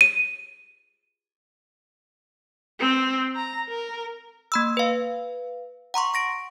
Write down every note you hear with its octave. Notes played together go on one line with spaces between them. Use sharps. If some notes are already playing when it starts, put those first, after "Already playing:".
D#7
C4
A#5
A#4
A#3 B5 E6
B4 F5
F#5 A#5 C6 C#6
C#6 A#6 D7